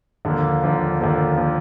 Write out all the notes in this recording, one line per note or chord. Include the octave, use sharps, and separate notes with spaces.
D#2 D3 F3 A#3
D#2 D3 F3 A#3
D#2 D3 F3 A#3
D3 F3 A#3